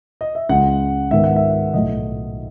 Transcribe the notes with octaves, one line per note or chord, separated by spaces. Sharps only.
D#5
E5
C#2 C#3 G#3 C#4 F#5
G#2 D#3 G#3 B3 E5
F#5
E5
B1 A2 F#3 A3 D#5